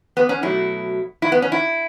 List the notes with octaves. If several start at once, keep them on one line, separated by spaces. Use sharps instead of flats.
B3
C#4
B2 F#3 A3 E4
E4
B3
C#4
E4